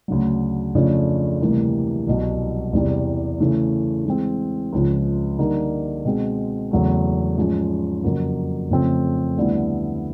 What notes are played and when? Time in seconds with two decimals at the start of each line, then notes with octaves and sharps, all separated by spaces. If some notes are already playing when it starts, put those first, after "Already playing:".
0.08 D2 C#3 F#3
0.75 F2 C#3 F3 A3 D4
1.41 D2 C3 E3 G3 A#3
2.07 C2 B2 F#3
2.73 E2 C3 E3 G3
3.40 C#3 E3 A3
4.06 E3 G#3 C4
4.73 C#2 C#3 F3
5.38 D3 G3 A#3 D#4
6.05 B2 G#3 C4
6.71 E2 C#3 F#3 A3
7.38 G#2 F3 G#3 C#4
8.04 F2 C#3 F#3 A#3
8.70 F2 C#3 F3 A3 C4
9.37 D2 D3 G3 B3 E4